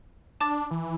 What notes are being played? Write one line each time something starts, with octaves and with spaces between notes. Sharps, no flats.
D4 A5 D6 A6
E3